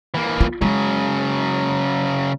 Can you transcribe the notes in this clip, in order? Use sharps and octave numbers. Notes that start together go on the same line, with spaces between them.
E3 A#3
F4
C#3 F#3 G#3